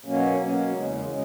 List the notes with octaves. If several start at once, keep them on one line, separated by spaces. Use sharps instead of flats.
B2 F#3 A#3 C#4
B2 F#3 A#3 C#4
E2 C#3 G#3
C#3 G#3